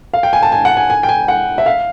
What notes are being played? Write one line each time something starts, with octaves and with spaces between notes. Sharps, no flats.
F5
G5
G#5
A5
G#5
F#5
G#5
G#5
G5
G#5
F#5
E5
F5